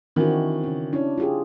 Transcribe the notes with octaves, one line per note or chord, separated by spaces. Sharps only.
D#3 E3 C4 D4 F#4
C#3 C#4
C#4 D4 E4
F4 G4 G#4